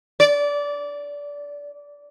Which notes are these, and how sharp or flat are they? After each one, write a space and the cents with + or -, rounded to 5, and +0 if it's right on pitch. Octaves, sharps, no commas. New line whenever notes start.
D5 -20